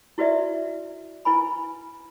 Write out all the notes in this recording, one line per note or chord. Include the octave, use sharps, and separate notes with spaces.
E4 F#4 B4 D5 E5
E4 B4 G#5 B5